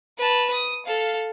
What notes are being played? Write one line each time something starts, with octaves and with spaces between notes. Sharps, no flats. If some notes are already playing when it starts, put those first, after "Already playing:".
B4 A5
D#6
A4 F5